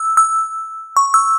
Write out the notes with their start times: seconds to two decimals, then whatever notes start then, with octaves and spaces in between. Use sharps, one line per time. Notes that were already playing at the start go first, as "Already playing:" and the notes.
Already playing: E6
0.17 E6
0.97 C#6
1.14 E6